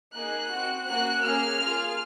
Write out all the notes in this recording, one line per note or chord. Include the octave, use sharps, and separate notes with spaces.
A#3 D#4 G#4 F#6
C4 F#4
A#3 C#4 F#4 F#6
A#3 C#4 G#4 F6
A#3 F4 G#4